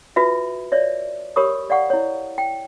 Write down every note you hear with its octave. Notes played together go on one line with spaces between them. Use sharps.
F4 F#4 B4 E5
C#5 D5 E5
G4 A#4 C#5 B5 C#6 D#6
D5 F5 F#5 C#6
E4 C#5
G5